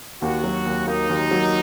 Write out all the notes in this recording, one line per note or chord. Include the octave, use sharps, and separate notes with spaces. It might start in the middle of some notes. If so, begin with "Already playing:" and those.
D#2 F#4
F#3
D#2
A#3 D#4
D#2
F#3